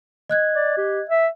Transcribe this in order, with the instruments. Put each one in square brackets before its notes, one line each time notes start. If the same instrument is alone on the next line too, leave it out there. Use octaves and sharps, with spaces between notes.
[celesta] D#5 F#6 G#6
[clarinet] D5
G4
E5